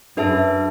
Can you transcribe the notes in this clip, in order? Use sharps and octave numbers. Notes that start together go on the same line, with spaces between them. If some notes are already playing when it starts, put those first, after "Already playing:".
F#2 D4 G#4 B4 E5 A5